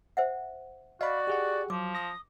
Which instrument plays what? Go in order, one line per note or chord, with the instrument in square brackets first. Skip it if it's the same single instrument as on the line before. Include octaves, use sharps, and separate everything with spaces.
[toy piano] C5 E5 F#5
[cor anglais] F#4 [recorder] D5 [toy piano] D#5 [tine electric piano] F5 B5
[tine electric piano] G4 G#4 F#5
[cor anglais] F3 [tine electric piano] F#3 [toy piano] D6
[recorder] D#6 [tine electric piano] A#6